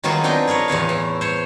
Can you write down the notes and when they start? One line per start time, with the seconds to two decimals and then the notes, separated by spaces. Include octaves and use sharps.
0.04 D#3 F#3 B3 F4 G#4
0.23 C4 D4 D#4 A#4 G5 A#5
0.47 G#4 A#4 B4 C#5
0.68 E2 A2 C#5 F5
0.89 E3
1.21 C5 C#5